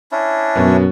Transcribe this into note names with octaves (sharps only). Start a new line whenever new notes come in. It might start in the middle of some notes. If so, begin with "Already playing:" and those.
C#4 D4 E4
F#2 B2 B3